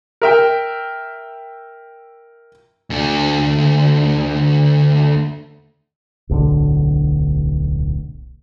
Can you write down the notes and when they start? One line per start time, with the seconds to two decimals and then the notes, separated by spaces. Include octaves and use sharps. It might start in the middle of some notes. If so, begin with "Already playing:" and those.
0.22 A#4 E5 G5
2.90 D2 D3
6.29 D1 B1 A2 D3